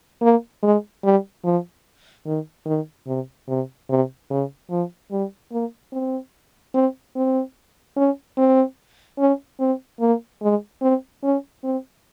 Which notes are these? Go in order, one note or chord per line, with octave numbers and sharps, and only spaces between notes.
A#3
G#3
G3
F3
D#3
D#3
C3
C3
C3
C#3
F3
G3
A#3
C4
C4
C4
C#4
C4
C#4
C4
A#3
G#3
C4
C#4
C4